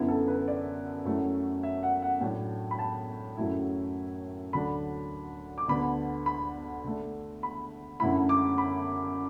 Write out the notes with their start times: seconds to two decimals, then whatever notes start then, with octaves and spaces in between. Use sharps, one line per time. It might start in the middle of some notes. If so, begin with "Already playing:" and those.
Already playing: F#2 D3 B3 E4
0.08 A4
0.28 B4
0.48 D5
1.05 F#2 F#3 A3 E4
1.63 E5
1.83 F#5
2.02 F#5
2.21 A2 F#3 D4
2.71 B5
2.79 A5
3.37 F#2 F#3 A3 E4
4.53 D2 D3 F#3 D4 B5
5.58 D6
5.68 D2 D3 B3 D4 B5
6.26 B5
6.84 D3 A3 D4
7.43 B5
8.00 F#2 D3 A3 E4 B5
8.29 D6
8.58 B5